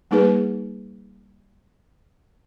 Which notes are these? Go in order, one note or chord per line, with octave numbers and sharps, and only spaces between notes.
G3 A#3 D#4 G#4 B4